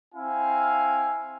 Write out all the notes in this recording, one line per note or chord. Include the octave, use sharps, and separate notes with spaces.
C4 E4 F5 G#5